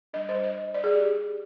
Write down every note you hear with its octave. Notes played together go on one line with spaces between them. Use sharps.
G3 D4 D#5
C5
D#5
D5
G#4
G4